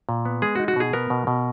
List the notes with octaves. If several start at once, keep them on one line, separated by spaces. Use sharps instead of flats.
A#2
B3
G#3 G#4
F#4
D#4
F#4
B2 G#4
B3 A#4
B2
B2